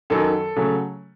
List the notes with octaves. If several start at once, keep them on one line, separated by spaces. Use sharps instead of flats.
F#2 D#3 F#3 A4
C#3 F#3 A3